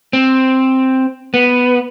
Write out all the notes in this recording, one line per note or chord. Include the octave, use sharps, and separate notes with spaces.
C4
B3